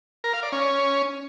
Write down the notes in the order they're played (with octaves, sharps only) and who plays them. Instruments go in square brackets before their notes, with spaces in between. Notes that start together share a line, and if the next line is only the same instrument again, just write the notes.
[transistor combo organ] A#4
F5
D5
C#4